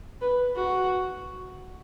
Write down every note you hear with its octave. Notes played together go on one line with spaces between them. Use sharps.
B4
F#4